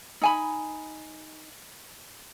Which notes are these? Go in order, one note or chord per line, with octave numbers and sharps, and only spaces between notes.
D#4 G#5 B5